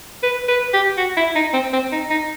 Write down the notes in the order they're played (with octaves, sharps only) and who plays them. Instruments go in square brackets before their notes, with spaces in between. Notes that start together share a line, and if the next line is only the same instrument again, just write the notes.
[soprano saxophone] B4
B4
G4
F#4
E4
D#4
C4
C4
D#4
D#4